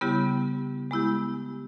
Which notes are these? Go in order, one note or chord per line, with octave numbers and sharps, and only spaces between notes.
C#3 G3 B3 E4 G4
G#3 B3 E4 G4